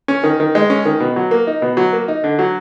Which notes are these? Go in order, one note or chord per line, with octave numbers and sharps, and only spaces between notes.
C#4
D#3
D#3
G#3
C#4
D#3
B2
F#3
A#3
D#4
B2
F#3
A#3
D#4
D3
F#3